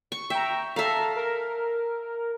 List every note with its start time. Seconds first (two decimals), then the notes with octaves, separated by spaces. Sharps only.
0.12 C#6
0.30 E5 G5 A#5
0.76 A4 E5 F5 A#5
1.16 A#4